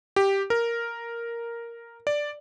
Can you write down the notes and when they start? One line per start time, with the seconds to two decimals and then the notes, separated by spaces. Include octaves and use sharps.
0.16 G4
0.50 A#4
2.07 D5